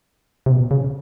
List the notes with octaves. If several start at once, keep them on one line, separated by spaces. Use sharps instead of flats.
C3
B2
C#3